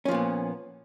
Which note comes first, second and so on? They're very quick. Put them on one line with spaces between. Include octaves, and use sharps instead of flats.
C#4 F3 A#2 B3